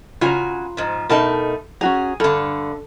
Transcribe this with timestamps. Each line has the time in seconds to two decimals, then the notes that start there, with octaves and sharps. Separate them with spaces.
0.21 C#3 F4 F#4 G#5 A#5
0.77 G#2 F3
1.09 B2 A3 D#4 A#4 A5
1.81 C#4 F#4 G#4 A#5
2.20 G2 D3 A4